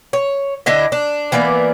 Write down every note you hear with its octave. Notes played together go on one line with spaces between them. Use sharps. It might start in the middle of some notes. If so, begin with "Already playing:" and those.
C#5
D3 D4 E4 D#5
D4
E3 A#3 B3 D5